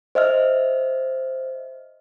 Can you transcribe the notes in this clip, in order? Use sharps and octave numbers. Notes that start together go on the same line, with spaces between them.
C5 D#5 E5 F6